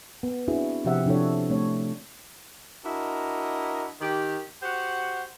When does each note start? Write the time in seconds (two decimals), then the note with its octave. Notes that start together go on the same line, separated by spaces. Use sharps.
0.23 B3
0.48 C4 D4 E4 F#4 G#4
0.85 C3 F3 G4 C5 E5 F#5
1.06 C3 F3 D4 E4 A4 C#5
1.50 A3 C4 C#5
2.85 D4 E4 F#4 A#4 D#5
4.01 D#3 G4
4.62 F#4 G4 C5 F#5